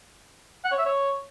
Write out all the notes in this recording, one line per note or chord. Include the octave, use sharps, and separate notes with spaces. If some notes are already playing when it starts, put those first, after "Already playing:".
F#5
C#5
E5
C#5